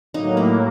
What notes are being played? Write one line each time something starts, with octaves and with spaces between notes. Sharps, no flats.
A2 F#3 A#3 D#4
E4